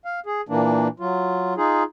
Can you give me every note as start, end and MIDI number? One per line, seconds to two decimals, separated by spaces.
0.05 0.20 77
0.26 0.41 68
0.49 0.88 46
0.49 0.88 52
0.49 0.88 58
0.49 0.88 62
1.00 1.54 54
1.00 1.54 65
1.57 1.83 63
1.57 1.83 65
1.57 1.83 68